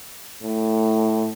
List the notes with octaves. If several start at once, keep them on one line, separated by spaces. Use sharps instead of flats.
A2